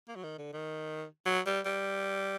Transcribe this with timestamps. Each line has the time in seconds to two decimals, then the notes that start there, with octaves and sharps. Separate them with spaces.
0.08 A#3
0.16 F#3
0.23 D#3
0.38 D3
0.53 D#3
1.26 F#3
1.46 G3
1.65 G3